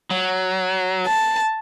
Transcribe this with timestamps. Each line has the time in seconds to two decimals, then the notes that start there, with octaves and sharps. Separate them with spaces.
0.10 F#3
1.07 A5